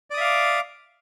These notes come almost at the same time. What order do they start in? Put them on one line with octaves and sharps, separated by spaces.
D5 D#6 E5 F5 D6